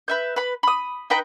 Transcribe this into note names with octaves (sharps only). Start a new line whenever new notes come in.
B4 E5 G6
B4 B5
B5 D#6
D#4 B4 G5 A#5